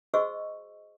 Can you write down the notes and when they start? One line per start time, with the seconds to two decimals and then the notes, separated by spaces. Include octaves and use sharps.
0.14 F#4 G#4 C5 D#5 C#6 E6